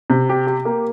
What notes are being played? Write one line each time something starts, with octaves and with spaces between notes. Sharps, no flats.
C3
G4
G4
A#3